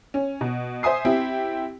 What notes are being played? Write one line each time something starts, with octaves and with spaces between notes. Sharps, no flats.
C#4
B2
C5 E5 G#5 D#6 C7
C4 E4 G4